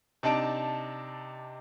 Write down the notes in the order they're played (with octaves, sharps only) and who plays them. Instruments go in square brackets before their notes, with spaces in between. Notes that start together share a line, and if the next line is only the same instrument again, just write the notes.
[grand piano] C3 D4 D#4 A5 D7